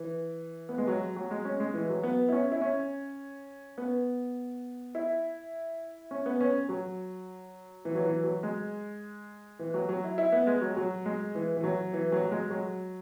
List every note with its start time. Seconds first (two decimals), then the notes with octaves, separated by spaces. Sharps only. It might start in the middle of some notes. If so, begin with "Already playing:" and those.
Already playing: E3
0.69 B3
0.78 G#3
0.87 F#3
1.16 F#3
1.31 G#3
1.45 C#4
1.60 G#3
1.74 E3
1.89 F#3
2.03 B3
2.29 E4
2.32 C#4
2.52 E4
2.61 C#4
3.78 B3
4.95 E4
6.11 C#4
6.26 B3
6.40 C#4
6.69 F#3
7.85 E3
7.95 F#3
8.05 E3
8.24 F#3
8.43 G#3
9.59 E3
9.74 F#3
9.89 F#3
10.04 E4
10.18 E4
10.32 B3
10.47 G#3
10.61 F#3
10.77 F#3
11.05 G#3
11.35 E3
11.57 E3
11.63 F#3
11.93 E3
12.12 F#3
12.25 F#3
12.31 G#3
12.51 F#3